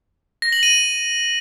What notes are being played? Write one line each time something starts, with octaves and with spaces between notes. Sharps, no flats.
A#6
F#7
D#7